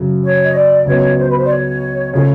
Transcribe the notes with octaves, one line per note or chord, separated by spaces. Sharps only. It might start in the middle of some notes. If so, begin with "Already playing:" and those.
Already playing: F#2 C#3 F#3
C#5
D#5
D5
C#2 C#3 F#3 B3 C#5
C5
B4
C5
D5
C#5
C#3 F3 A3 C#5